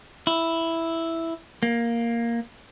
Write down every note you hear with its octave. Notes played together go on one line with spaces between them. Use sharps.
E4
A#3